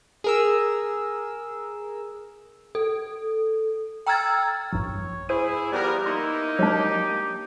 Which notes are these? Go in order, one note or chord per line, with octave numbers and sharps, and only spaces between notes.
G#4 A#4 E6
A4
G5 A#5 E6 F6 G#6 A6
A#1 G2 C#5
E4 G#4 C5 D#7
F3 G3 B3 A#4
A#3 D#4 E4 C6 A6
F#3 G#3 D4 G4